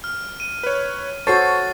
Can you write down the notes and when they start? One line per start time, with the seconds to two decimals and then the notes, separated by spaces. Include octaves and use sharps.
0.04 F6
0.40 D#7
0.63 B4 C#5
1.27 F#4 A4 C5 C#5 A5 C#6 A6 C7